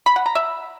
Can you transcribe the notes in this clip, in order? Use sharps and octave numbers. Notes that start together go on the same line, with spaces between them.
B5
F#5
A#5
E5